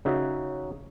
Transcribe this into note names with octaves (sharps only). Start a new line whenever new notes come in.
C#3 D#4 F#4 E5